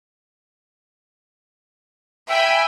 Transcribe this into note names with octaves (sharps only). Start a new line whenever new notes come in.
E5 G5 G#5 B5